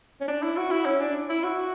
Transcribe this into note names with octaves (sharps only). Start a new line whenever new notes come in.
C#4
D4
E4
F#4
E4
C#4
D4
E4
F#4